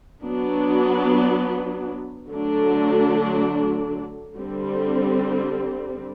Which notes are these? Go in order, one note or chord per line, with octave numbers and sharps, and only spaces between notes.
F#3 B3 D4
D3 F#3 A3 D4
D3 G3 C4